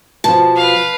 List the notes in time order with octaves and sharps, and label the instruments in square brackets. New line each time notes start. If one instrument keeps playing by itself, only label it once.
[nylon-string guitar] B2 F3 [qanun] A5
[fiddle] B4 F5